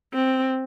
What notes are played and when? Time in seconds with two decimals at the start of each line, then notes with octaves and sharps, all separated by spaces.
0.13 C4